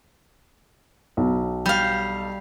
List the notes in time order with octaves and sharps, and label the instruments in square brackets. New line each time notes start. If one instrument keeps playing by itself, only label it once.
[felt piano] B1
[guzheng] G3 F5